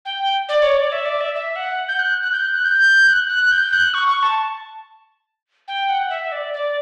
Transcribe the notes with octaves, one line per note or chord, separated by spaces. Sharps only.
G5
D5
C#5
D5
E5
D5
E5
E5
F#5
G6
F#6
F#6
G6
F#6
F#6
G6
F#6
F#6
G6
F#6
C#6
C#6
A5
G5
F#5
E5
D5
D5